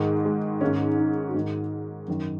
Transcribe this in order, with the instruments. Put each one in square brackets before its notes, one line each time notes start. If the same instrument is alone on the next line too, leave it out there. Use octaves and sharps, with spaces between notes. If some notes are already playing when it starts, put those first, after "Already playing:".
Already playing: [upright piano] G#2 D#3 G#3
G#3
G#2 D#3 C#4
D#4
F#4
G#2 D#3 D#4
F#2 D#3